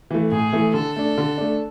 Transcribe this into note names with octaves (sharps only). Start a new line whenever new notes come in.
E3 A3
A2 G#4
E3 A3
D3 A4
A3 D4
D3
A3 D4